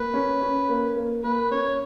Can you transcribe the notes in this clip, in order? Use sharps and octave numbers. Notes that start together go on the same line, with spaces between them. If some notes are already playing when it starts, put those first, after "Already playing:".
Already playing: A#3 B4
C#4
C#4
A#3
A#3
A#3 B4
C#4 C#5